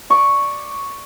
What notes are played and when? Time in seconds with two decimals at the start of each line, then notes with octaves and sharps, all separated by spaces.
0.10 D5 C#6